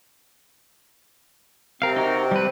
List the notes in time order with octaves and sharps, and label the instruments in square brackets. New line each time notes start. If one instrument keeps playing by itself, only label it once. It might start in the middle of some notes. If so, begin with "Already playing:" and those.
[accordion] C3 C4 [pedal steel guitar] A#4 F5
[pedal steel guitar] D#4 F#4 A#4
G3 B4